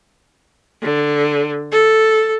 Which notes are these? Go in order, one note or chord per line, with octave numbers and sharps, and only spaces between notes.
D3
A4